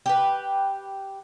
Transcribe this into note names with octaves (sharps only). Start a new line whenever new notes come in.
G4 B4